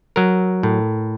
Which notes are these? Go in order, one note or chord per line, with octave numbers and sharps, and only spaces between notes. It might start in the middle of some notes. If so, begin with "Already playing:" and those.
F#3 A#4
A2